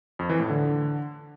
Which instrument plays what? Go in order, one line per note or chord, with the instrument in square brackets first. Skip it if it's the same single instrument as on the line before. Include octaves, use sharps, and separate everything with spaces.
[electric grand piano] F2
E3
A2
D3